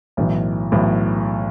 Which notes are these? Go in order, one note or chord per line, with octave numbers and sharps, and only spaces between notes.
B1 A2 E3
B1 A2 E3